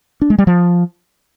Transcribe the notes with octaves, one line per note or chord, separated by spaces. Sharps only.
D4
G#3
G3
F3